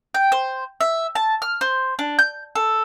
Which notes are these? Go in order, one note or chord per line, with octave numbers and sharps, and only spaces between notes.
G5
C5
E5
A5
F6
C5
D4
G6
A4